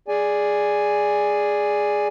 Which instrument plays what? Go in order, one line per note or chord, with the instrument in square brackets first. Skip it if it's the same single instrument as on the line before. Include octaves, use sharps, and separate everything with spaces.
[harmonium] G#4 D5 G#5